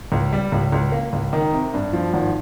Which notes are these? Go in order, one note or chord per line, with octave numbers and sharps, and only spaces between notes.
C#2
G3
C#2
C#2
A#3
C#2
D#3
C3
G2
F3
G#1